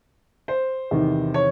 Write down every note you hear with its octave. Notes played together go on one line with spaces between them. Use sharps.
C5
E2 C3 D#3
C#5